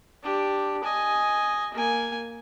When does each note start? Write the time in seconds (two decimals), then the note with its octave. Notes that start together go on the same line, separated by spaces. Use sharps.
0.23 D4 G4
0.84 D#5 G#5
1.74 A#3 G#5